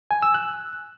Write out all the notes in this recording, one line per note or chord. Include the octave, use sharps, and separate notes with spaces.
G#5
E6
F#6